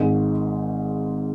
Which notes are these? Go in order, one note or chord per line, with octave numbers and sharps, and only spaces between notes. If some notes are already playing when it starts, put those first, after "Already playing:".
Already playing: G#1 G#2 D#3